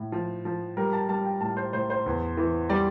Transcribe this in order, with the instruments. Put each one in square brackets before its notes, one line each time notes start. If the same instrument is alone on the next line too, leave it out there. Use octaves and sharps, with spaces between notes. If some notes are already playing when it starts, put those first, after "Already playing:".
Already playing: [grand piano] A2
F3
F3
G3 A#4
A5
G3 A5
G5
A2 A5
C5
A2 C5
C5
E2
E3
G3 D5